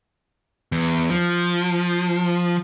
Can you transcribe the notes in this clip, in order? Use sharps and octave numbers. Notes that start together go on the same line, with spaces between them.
E2
F3